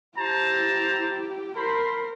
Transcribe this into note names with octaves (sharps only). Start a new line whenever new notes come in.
E4 G4 C5 A5 A#5
A#4 C5 B5 C6